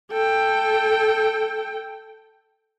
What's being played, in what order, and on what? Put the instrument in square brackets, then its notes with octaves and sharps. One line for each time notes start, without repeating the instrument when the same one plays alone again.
[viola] A4 G5